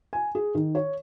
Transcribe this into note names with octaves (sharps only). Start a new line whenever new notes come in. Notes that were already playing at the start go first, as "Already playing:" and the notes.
G#5
G#4
D#3
C#5